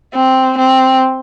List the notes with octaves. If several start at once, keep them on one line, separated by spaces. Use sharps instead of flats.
C4
C4